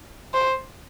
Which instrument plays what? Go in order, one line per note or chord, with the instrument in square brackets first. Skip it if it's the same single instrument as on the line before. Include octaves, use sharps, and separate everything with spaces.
[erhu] C5